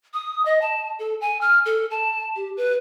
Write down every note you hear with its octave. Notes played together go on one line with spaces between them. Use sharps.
D#6
D#5
A5
A4
G#5
F6
A4
A5
G4
B4